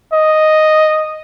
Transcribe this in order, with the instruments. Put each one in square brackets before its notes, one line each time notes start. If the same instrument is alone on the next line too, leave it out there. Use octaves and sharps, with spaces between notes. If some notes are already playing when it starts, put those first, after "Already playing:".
[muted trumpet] D#5